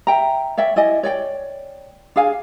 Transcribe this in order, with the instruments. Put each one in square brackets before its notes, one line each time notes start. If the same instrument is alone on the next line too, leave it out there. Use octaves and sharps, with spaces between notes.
[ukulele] E5 G5 A#5
C#5 D5 E5 G5
E4 D5 D#5 G#5
C#5 D5 G5
D4 G#4 F5 G#5